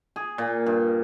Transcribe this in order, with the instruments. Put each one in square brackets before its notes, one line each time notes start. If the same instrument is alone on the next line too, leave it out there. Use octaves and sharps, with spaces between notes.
[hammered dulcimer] G#4
A#2
G2